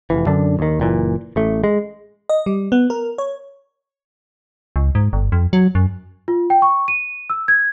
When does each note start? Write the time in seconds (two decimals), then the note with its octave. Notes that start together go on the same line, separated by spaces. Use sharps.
0.10 F1 C2 E3
0.27 F#2 D3 D4
0.59 D#2 D#3
0.80 F#1 A#2 E3
1.36 A1 A3
1.64 G#3
2.29 D#5
2.46 G3
2.72 B3
2.90 A#4
3.18 C#5
4.76 C#2
4.95 G#2
5.13 G1
5.32 F2
5.53 F#3
5.75 F#2
6.28 F4
6.50 G5
6.62 C#6
6.88 D#7
7.30 E6
7.48 G#6